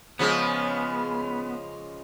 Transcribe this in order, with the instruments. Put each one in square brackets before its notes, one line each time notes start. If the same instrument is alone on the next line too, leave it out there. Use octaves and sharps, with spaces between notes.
[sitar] C#3 F3 G#3 [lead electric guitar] B3